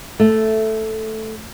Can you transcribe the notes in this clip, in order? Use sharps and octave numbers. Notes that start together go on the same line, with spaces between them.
A3